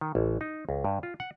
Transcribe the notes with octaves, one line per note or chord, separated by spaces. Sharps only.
D#3
A1
D#4
C#2
G2
F4
F#5